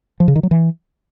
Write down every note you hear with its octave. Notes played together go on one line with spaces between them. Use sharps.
F3
C#3
D#3
F#3
E3